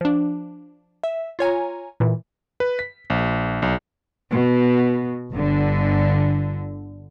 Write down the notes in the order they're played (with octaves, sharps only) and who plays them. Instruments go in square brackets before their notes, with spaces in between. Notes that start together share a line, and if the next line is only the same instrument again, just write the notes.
[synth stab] F3 D4
E5
F4 C#5 G#5 A#5
A#2 E3
[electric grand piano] B4
B6
A#1
B1
[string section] B2
G1 D3